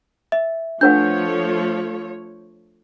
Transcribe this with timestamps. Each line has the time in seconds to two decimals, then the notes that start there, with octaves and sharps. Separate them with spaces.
0.32 E5
0.81 F3 A3 D4 B4 C#5 F#5 G6